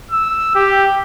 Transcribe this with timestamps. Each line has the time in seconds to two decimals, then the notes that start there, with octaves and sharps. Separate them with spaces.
0.11 E6
0.55 G4